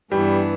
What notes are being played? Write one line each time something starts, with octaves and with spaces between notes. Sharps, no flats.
G2 E3 G3 B3 D4